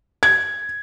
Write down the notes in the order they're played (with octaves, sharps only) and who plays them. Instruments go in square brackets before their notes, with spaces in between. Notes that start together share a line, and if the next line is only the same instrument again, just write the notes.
[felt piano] G#6